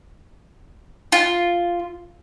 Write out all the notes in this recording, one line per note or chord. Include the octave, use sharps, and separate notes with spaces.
F4